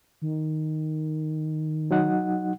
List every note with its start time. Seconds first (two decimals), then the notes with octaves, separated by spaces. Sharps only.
0.22 D#3
1.91 F#3 D#4 F#5